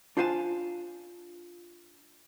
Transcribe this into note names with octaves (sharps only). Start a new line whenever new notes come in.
D4 F4 C5 F5 G#5 A5